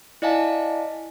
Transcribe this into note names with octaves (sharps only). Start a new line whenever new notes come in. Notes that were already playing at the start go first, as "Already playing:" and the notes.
E4 D5 D#5 F5 G#5 A5